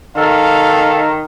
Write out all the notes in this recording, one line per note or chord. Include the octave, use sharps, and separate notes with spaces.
D#3 A4 F5